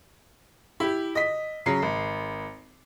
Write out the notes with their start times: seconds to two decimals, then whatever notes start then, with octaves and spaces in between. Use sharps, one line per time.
0.80 E4 G4
1.15 D#5 B6
1.66 C#3 F#3 C7
1.82 G#1